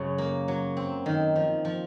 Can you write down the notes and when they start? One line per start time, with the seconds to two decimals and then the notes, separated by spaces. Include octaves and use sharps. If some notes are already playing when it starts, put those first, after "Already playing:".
Already playing: F#2 C#3
0.18 A#3
0.48 F#3
0.77 C4
1.06 D#3
1.36 F3
1.65 F3